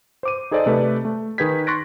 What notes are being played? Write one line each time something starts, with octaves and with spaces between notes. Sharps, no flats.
C5 D6 D#7
D#4 G#4 A4 C5 D5 D#5
C3 A3 B4 D5
A3
D#3 G#4 B4 G6 G#6 B6
C6 C#6 F#6 A6 A#6 D7